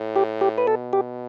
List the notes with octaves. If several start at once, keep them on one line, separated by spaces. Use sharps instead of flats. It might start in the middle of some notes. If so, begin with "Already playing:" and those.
Already playing: A2
G4
G4
B4
B2 A4
G4